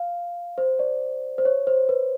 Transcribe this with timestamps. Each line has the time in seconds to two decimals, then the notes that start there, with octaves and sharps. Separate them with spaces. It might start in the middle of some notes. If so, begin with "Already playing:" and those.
Already playing: F5
0.58 C5
0.79 D5
1.38 C5
1.45 C#5
1.67 C5
1.89 B4